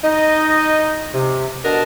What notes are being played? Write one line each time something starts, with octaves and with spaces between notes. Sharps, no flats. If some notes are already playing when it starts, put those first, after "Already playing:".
D#4 D#5
C3
B2 D3 D4 A#4 D#5 A5